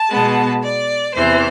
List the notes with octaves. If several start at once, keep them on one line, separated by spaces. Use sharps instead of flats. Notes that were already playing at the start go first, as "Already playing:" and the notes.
Already playing: A5
B2 G#3 B3
D5
E2 C3 E3 C5